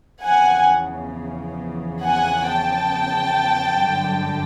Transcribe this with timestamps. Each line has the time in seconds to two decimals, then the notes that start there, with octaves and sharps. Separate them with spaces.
0.24 E2 C#3 F3 F#5 G#5
2.03 F#5 G#5
2.48 G5 A5
3.82 G1 F#2 D3 G3